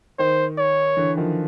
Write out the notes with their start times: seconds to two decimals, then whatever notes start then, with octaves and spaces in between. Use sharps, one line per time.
0.19 D#3 C5
0.58 C#5
0.97 D3 E3
1.17 D#3 F3